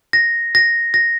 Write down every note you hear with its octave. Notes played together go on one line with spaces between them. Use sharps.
A#6
A#6
A#6